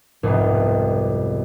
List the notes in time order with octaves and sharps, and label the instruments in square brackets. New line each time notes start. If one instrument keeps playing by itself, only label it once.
[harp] C2 F2 G#2 B2